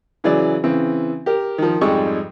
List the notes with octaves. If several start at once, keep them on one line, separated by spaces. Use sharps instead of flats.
C#3 E3 F#3 G#4 D5
C#3 E3 C4
G4 A#4
D#3 F3
F2 G#2 G3 G#3 C#6